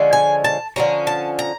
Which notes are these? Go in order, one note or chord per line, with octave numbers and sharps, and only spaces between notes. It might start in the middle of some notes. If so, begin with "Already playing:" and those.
Already playing: D3 F3 G#3 C#4
G#5
A5
D3 F3 G#3 C#4 A#5
A5
A#5